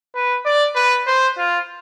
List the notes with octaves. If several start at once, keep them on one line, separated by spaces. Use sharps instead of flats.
B4
D5
B4
C5
F4